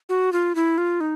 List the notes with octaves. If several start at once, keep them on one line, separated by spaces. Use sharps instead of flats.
F#4
F4
E4
F4
D#4